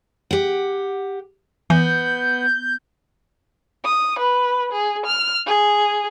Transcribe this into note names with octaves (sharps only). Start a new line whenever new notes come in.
G4 F#5
E3 B3 G6
D#6
B4
G#4
F6
G#4